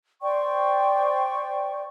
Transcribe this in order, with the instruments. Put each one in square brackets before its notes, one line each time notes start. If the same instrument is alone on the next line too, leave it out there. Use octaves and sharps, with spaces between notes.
[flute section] C5 D5 G5 C#6